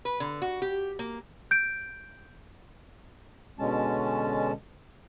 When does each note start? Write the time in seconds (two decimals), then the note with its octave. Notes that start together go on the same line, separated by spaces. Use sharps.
0.05 B4
0.20 D3
0.42 F#4
0.62 G4
0.99 A#3
1.51 G6 D7
3.59 B2 D3 G#3 C#4 A5